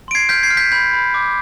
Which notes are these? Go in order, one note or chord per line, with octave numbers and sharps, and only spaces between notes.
C6 D7
G#6 C7
F6 G6 B6
G#6 C7
F6
G6 B6
B5 G6
B5
D6